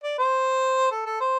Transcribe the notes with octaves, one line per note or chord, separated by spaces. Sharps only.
D5
C5
A4
A4
C5